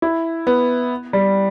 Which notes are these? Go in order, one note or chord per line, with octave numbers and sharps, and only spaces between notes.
E4
B3
G3